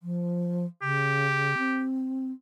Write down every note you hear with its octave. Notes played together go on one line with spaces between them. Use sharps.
F3
C#3 G4
C4